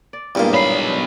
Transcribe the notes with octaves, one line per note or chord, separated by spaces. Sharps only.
D5
E2 G2 A#2 G3 G#3 A#3
B1 C#5 B5 C7